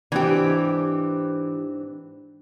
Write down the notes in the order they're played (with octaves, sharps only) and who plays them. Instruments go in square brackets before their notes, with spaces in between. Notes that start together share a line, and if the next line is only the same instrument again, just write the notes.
[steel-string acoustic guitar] G#2 C4 D4 [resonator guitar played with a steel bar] E3 G4